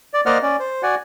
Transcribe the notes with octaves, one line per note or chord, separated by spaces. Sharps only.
D5
A#3 C5 D5 D#5 F#5 F6
C#4 D5
C5
F#4 D5 F#5 G#5